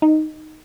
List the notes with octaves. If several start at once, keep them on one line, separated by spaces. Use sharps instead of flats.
D#4